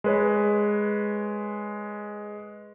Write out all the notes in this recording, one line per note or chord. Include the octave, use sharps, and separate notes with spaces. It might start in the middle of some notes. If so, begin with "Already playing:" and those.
G#3 B4 C#5